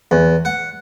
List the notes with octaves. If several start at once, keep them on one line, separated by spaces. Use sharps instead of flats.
E2
F#5